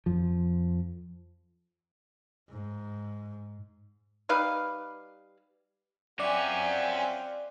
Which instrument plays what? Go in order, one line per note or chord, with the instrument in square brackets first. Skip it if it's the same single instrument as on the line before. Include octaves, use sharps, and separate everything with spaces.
[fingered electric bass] F2 F3
[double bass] G#2
[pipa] G3 D#4 B4 F5
[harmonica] C4 F4 G5 [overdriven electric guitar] C#4 F#4 [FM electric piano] D5 [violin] E5 G#5